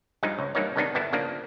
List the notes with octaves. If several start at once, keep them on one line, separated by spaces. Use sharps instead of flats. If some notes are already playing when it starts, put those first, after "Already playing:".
G2 F3 G#3 D#4 F4
C#2
G2 E3 A#3 D#4 C#5
C3 D#3 G#3 B3 D4 D#4
G1 G3 B3 E4 A5
C#3 F3 A#3 D4